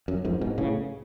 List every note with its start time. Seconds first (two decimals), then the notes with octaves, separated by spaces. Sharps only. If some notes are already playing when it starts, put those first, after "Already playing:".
0.08 F#2
0.25 F2 G#2
0.41 G#2 B2
0.58 A2 C#3